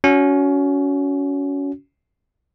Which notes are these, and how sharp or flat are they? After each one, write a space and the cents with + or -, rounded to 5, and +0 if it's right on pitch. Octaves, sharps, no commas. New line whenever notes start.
C#4 +25 F#4 +0